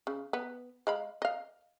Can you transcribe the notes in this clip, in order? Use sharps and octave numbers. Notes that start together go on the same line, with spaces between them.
C#3
B3
G#3 F5 B5
D#5 F5